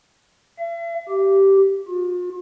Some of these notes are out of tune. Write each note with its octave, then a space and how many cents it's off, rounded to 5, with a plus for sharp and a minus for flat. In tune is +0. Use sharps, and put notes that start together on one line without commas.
E5 +45
G4 -10
F4 +45